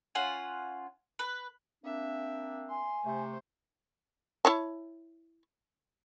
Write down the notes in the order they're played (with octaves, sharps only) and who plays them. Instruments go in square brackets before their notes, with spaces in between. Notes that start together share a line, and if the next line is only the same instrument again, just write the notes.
[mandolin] C#4 F4 F#5 G#5
B4
[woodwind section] A#3 C4 D4 [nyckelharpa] E5
[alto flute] G#5 [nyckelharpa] C6
[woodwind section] C3 A3 [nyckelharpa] C5
[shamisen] E4 C#5 A5